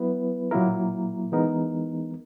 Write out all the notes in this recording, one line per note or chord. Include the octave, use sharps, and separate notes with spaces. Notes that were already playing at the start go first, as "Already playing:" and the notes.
Already playing: F#3 B3 E4 B4
A#2 F#3 A#3 E4 A#4
E3 G#3 B3 D#4 A#4